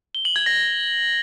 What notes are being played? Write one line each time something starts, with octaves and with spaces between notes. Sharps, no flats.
G7
F#7
G#6
A#6